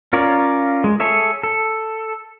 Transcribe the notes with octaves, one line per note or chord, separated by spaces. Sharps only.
C#4 F4 A#4 C#5 D5
G#3
G#4 A4 C#5 E5
A4